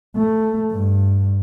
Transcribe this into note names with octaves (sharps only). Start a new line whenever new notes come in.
A3
G2